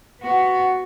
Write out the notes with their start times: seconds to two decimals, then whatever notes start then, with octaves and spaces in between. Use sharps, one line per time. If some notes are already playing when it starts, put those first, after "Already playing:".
0.21 B3 F#4